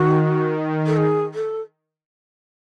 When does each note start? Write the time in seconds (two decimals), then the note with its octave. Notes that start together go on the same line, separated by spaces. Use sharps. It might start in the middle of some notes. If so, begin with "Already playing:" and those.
Already playing: D#3 F#4
0.86 A4
0.96 G#4
1.34 A4